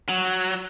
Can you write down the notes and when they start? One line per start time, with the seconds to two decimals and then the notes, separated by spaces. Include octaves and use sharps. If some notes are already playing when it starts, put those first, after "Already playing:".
0.09 F#3